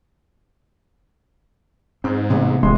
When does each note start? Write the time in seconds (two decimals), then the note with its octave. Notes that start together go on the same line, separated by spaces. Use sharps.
2.04 G#2 C4
2.30 A1 C3 B3
2.63 D#1 A1 G#3 C6